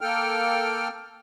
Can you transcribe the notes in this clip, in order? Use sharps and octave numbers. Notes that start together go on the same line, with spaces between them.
A#3 A4 G5 F6